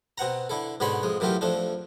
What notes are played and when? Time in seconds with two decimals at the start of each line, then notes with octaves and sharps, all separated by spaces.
0.18 B2 C4 F#5 A#5
0.49 D3 E4 A4
0.80 G#2 B2 D3 C#5 B5 C6
1.03 F2 G#3
1.20 F#2 E3 F#3 A3 F4 G4
1.41 F2 F3 A3 D4